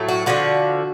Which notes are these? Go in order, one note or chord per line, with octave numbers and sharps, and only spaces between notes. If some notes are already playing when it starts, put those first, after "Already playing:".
Already playing: A2 F#3 A3
F#4
D3 F3 G#3 F#4